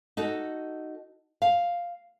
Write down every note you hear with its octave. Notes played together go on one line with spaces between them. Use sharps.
D#4 F#4 A4
F5